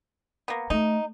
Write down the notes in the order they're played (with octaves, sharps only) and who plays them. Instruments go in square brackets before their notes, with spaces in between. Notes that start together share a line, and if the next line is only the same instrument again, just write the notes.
[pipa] A#3 B3
[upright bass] A3 [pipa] D#4